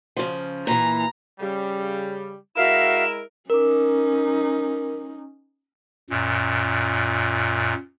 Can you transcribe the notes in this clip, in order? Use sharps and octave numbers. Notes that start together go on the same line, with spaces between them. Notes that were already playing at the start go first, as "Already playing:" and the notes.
C#3 F3
A#2 E3 A#5
C#3 G3
G#3 E4 F#4 A#4 E5 F5 E7
C#4 D#4 A#4 D6
F#2 A#2